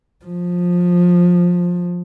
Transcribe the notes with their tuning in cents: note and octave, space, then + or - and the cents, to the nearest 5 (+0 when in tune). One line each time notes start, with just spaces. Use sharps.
F3 +15